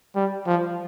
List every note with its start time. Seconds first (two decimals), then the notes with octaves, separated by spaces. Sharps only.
0.15 G3
0.46 F3